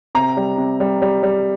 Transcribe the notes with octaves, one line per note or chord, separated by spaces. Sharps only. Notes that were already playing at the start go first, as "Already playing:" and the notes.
C3 A#5
G3
C3
G3
G3
G3